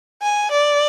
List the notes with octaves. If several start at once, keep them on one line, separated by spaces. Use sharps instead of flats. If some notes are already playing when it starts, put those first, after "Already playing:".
G#5
D5